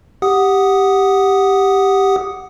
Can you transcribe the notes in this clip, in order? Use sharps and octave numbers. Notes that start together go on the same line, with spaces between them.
G4 F#5 D#6